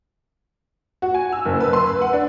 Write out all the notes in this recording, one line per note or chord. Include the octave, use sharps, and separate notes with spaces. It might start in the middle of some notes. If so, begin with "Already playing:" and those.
F#4
G#5
E6
F#1
B4
C6
B4
F#5
D4